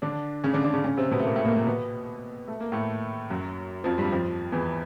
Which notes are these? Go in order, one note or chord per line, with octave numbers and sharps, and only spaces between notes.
D3 D4
C#3 C#4
D3 D4
D3 D4
C#3 C#4
C#3 C#4
C3 C4
B2 B3
A3
A#2 A#3
A2 A3
A#2 A#3
A#2 A#3
B2 B3
A3
A#3
A2 A3
F#2 F#3
F2 F3
G2 G3
F2 F3
E2 E3